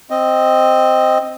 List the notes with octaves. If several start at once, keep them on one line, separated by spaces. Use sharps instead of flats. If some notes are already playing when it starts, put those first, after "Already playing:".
C4 D#5